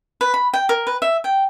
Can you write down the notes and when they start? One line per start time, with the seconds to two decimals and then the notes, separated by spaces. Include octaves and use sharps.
0.21 B4
0.34 B5
0.54 G5
0.69 A#4
0.87 B4
1.02 E5
1.24 G5